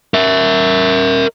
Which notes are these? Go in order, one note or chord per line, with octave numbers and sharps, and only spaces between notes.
A#4 E5